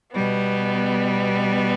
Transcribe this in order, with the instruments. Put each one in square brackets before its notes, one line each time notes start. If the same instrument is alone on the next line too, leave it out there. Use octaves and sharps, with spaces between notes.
[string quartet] B2 G3 B3